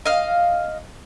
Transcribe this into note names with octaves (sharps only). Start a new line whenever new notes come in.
D#5 F5